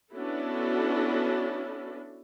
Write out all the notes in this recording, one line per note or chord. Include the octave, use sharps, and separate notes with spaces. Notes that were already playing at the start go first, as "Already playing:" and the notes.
B3 C#4 D4 E4 F#4 A4